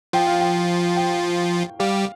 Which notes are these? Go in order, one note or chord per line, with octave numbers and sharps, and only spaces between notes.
F3 F4 G5
F5
G5
G5
G3 G4 F5